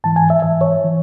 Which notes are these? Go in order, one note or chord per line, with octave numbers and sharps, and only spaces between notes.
G#2 E3 A5
G#5
E5
G#2 E3 E5
C#5
E3